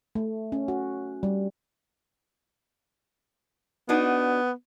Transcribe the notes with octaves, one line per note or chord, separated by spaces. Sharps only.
A3
C#4
F#4
G3
B3 D4 D#4 F#4